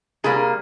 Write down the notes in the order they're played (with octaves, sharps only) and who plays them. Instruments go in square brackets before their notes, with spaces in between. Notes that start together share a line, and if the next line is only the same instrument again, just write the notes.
[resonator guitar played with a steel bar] C3 G3 A#3 G#4